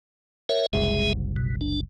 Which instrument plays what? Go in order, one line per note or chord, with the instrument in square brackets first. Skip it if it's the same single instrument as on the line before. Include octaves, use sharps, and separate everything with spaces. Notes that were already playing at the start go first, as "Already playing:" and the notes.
[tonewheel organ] A#4 C#5 E5
[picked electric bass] F#1 C2 [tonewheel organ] G#3 G#4 E5
[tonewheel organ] B2
D4